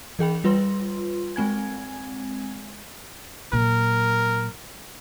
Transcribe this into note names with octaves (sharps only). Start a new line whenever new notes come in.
E3 G#4 G5 B5
G3 F4 B4 C6
G#3 C4 G#5 G#6
A#2 F#3 A#4